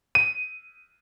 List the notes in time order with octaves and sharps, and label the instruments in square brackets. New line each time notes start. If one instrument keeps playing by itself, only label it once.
[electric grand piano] D#7